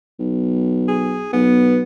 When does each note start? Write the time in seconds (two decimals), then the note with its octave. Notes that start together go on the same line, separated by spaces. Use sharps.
0.19 B1
0.88 G#4
1.33 B1 B3